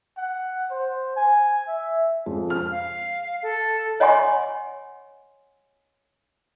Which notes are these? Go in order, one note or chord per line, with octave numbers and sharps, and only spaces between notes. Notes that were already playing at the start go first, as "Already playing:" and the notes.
F#5
C5
G#5
E5
F2 G#3
F6
F5
A4
C#5 D#5 F#5 G#5 C6 C#6